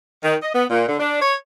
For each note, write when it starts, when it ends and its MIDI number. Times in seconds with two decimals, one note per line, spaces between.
0.24 0.36 51
0.42 0.51 75
0.54 0.64 59
0.70 0.84 46
0.88 0.98 50
1.00 1.18 62
1.21 1.35 73